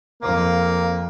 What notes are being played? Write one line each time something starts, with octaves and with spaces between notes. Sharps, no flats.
F2 A#3